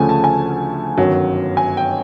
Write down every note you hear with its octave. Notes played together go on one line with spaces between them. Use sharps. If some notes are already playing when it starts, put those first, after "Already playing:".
Already playing: D2 C#3 F3 A3 G#5
A5
G#5
G1 F#2 D#3 F#3
G#5
G5